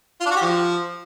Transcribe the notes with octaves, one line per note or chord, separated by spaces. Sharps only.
F4
D4
F#4
G4
F3